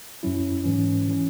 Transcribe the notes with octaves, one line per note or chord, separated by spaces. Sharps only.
F#2 F#3 C#4 E4
G#2 E3 C#4
E3 C#4